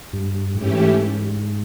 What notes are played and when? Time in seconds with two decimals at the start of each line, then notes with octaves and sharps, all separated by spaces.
0.13 G2
0.55 G#2 E3 A3 C#4 E4 G4